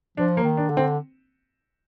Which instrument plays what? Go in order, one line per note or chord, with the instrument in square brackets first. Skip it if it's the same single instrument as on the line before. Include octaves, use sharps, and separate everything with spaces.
[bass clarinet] F3 [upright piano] D4
[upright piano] A#3
[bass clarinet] D#3
[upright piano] D4
[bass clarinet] D3
[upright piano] C4